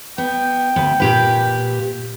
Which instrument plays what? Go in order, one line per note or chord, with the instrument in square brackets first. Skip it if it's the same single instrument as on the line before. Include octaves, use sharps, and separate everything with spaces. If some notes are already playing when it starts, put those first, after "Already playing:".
[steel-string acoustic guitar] B3 [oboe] G5
[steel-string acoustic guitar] D2 B3
A#2 G4 B4